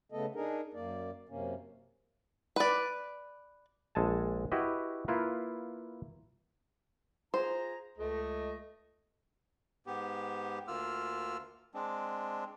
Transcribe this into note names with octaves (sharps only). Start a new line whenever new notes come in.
C#3 A3 B3 A4 D#5
D4 D#4 G#4 A#4
F#2 A#3 D5
F#2 C3 A#3 C#4
B4 D5
A#1 G#3 A4 G#5 A5
E4 F#4 G4 B4 D#5
A#3 E4 F4 B4
F4 G#4 C5 A#5
C#2 A3 D#5
G#2 B3 G4
D2 A#3 F4 E6 F6
G#3 C4 D4